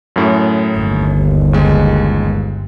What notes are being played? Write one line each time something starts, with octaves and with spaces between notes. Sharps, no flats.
F#2 A2
G1 D#2
C#2 G#3